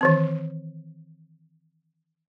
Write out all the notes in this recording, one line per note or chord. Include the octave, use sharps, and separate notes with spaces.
D#3 E3 C4